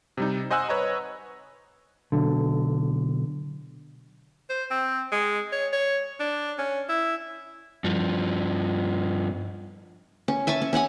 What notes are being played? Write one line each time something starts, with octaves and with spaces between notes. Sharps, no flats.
C3 G3 D#4
C5 D#5 F#5 G#5 E6 F#6
B4 C#5 D#5 A#5
B1 D3
C5
C4
G#3
C#5
C#5
D4
C#4
E4
G2 F3
C#4
E5 G#5 A5 C#6
C#4
C#4 C#5 F#5 G#5